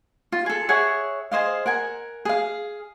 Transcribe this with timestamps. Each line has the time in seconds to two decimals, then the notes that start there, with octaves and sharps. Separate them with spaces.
0.32 F4
0.46 G#4 A4
0.69 G#4 C#5 E5 F#5
1.32 G#4 C5 D#5 F5
1.66 A#4 F#5 G#5
2.25 G#4 F5